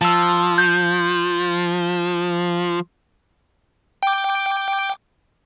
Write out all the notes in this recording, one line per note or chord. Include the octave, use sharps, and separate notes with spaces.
F3 A5 E6
G6
G5 D6